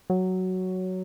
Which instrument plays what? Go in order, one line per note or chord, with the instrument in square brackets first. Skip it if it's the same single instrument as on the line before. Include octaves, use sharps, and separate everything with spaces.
[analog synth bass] F#3